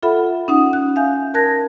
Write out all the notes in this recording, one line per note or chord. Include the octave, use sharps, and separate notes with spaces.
F4 A4 E5 F#5 B5
C#4 D#4 F#5 D#6
F#6
E5 F5 G#5 G6
A#4 A5 F#6 G#6 A#6